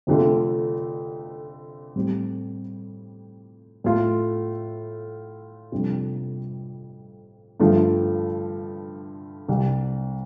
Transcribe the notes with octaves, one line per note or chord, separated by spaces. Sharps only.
F1 F2 D3 A3 F4
A2 G3 C4 G4
A2 A3 F4
F1 F2 C3 G3 D4
G2 D3 F3 A3
C2 C3 G3